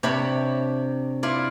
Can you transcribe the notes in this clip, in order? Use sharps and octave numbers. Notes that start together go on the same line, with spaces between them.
C3 D4 C#5 B5
E4 F4 D5